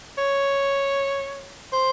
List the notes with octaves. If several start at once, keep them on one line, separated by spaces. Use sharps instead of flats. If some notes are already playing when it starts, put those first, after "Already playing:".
C#5
C5